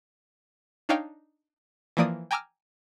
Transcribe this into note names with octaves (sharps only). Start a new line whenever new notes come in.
D4 D#4 C#5 F5 G5
E3 F3 A#3 D5 D#6
G5 G#5 A#5 D6 E6 F6